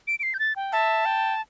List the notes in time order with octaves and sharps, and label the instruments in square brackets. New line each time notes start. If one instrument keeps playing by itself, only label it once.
[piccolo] D7
D7
C7
G6
A6
G5
[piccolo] E5 [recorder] A5
[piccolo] G5